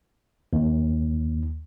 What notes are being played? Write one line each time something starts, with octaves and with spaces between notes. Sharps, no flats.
D#2